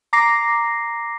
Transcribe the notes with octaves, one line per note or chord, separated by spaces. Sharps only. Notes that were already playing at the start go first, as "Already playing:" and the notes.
A#5 D6 A#6 C7